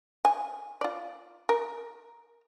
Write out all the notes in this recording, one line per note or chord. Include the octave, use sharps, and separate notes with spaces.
G#5
F4 D5
A#4